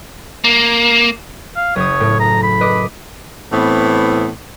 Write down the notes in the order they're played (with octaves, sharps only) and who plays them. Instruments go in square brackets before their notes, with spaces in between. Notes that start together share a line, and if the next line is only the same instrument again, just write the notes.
[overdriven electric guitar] A#3
[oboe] F5
[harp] F#1 D#6 [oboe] C#5
[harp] A2
[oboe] A#5
B5
[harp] B4 D#5 D6
[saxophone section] A2 E3 B3 C4